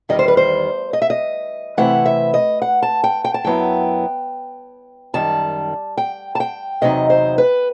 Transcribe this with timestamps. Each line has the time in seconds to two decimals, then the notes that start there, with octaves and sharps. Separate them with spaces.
0.09 E2 D#3 G3 D#5
0.19 C5
0.28 B4
0.37 C5
0.93 D#5
1.02 E5
1.10 D#5
1.77 C3 E3 A3 C4 E4 F#5
2.05 E5
2.34 D#5
2.62 F#5
2.82 A5
3.04 G5
3.24 G5
3.34 A5
3.44 F#2 F#3 B3 E4 G5
5.14 F#2 D#3 G3 A5
5.97 G5
6.35 A5
6.40 G5
6.81 E2 C3 F#3 B3 D#4 D#5
7.10 C5
7.38 B4